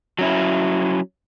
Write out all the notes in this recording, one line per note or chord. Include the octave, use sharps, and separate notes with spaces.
F#3 C#4 E4